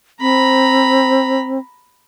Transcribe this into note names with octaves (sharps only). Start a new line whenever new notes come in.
C4 A#5 B5